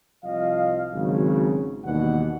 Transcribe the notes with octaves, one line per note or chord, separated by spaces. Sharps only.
C2 F3 D#5 F5
G#1 C#3 F#3
D#2 B2 E3 G3 D#4 F#5